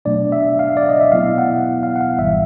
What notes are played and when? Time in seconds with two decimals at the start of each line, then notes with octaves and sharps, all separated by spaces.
0.05 B2 F#3 A3 D4 D5
0.32 E5
0.59 F5
0.77 D5
0.89 D#5
1.01 E5
1.12 B2 F#3 B3 E4 F5
1.38 F#5
1.83 F5
1.96 F#5
2.01 F5
2.18 G#1 G#2 E3 G3 E5